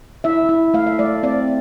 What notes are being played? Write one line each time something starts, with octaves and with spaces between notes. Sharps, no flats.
E4 E5
E4
A3 F5
E5
A3 D5
C4 D5